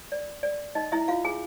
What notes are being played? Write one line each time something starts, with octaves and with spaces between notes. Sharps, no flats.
D5
D5
D#4 D#5
E4 E5
F4 F5
G#4 G#5